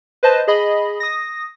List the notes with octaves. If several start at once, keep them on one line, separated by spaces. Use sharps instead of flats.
B4 C5 D#5 A5
G#4 D#5 B5
D#6 A#6